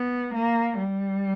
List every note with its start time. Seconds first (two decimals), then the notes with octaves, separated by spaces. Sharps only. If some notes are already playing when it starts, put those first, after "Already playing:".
Already playing: B3
0.35 A#3
0.79 G3